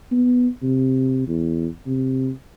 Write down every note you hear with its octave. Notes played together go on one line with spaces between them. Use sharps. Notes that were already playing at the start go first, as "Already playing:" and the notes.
B3
C3
E2
C3